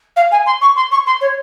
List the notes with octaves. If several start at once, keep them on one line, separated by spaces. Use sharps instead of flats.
F5
G#5
C6
C#6
C6
C#6
C6
C#5